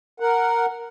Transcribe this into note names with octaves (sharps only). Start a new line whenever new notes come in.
A#4 F#5